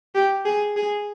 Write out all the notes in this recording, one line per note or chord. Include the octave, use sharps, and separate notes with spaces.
G4
G#4
G#4